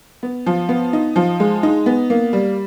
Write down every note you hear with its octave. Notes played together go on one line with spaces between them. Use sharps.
B3
F3
B3
D#4
F3
G#3
D#4
B3
A#3
G3